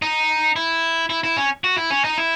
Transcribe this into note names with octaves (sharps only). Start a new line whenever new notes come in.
D#4
E4
E4
E4
C#4
F#4
E4
C#4
D#4
E4